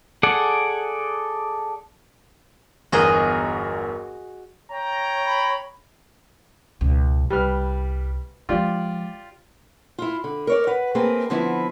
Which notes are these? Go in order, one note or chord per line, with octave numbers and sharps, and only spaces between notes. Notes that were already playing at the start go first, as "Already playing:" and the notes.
G#4 A4 D5 F#5
G1 E2 F#4 G#4 A#4 D#5
C#5 G5 A#5
B5
C#2 B2
C2 G3 B4 F6
F3 G#3 F4 G4 D5
E4 F4
D3
A#4 C#5 D5
B4 F#5
A3 A#3 C4 G#4 B4
D3 F3 B3 C4 E4